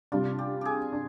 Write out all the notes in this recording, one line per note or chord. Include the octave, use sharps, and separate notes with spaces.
C3 G3 D4 F4
G4
G4 G#4
D4